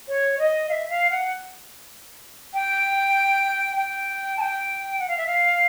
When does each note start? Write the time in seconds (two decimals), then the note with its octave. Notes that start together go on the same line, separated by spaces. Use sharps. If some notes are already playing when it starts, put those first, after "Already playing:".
0.08 C#5
0.39 D#5
0.69 F5
0.72 E5
0.89 F5
1.10 F#5
2.54 G5
3.76 G5
4.37 A5
4.41 G5
4.99 F#5
5.08 F5
5.18 E5
5.27 F5